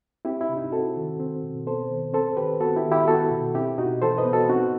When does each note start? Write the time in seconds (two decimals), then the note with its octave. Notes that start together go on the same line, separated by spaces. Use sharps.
0.25 C4 E4 G4
0.41 E4
0.49 C3
0.57 D#4
0.72 C4 F#4 A4
0.96 D#3
1.20 C4
1.43 B2
1.67 B3 A4 C5
1.90 D#3
2.13 C4 A4 C5
2.37 D#3 G4 B4
2.60 B3 F#4 A4
2.76 E4 G4
2.84 D#3
2.91 E4 G4
3.08 B3 F#4 A4
3.31 B2
3.55 C4 E4 G4
3.78 B2 D#4 F#4
4.02 E3 A4 C5
4.18 B4 D#5
4.25 B3
4.33 F#4 A4
4.49 C4 D#4 F#4